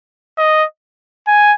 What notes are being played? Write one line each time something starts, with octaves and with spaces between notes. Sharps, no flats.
D#5
G#5